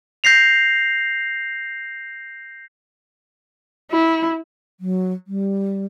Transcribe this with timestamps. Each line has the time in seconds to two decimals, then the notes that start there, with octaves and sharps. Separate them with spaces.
0.24 G6 A#6 C7 F7
3.91 E4
4.80 F#3
5.27 G3